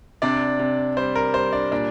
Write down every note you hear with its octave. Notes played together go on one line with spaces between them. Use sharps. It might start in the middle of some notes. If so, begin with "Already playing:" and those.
C3 D4 D5
C3
G3 C5
A#4
G3 C5
D4 D5
A#2 D4 D5